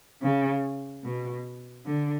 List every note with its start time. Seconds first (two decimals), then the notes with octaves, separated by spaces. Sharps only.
0.23 C#3
1.04 B2
1.86 D3